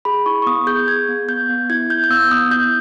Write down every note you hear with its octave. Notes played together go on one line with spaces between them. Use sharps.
G#4 B5
E4 C#6
C#6
B3 D#6
G#4 G6
G#4 G#6
B3
B3 G6
B3
E4 G#6
E4 G6
G6
B3 E6
B3 D#6
E4 G6